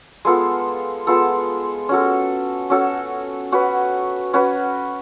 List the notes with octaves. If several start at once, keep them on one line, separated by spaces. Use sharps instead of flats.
G#3 B3 F4 A4
G#3 B3 F4 A4
C#4 F#4 A4
C#4 F#4 A4
C#4 F#4 B4
C#4 F#4 B4